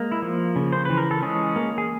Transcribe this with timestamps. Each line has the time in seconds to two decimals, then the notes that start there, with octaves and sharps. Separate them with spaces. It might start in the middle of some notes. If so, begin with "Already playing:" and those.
Already playing: G#3 A#3
0.12 E4
0.22 F3
0.56 C#3
0.73 C5
0.85 E3 B4
0.97 A#4
1.11 A4
1.22 G#3 C#4 G#4
1.56 A#3
1.78 G#4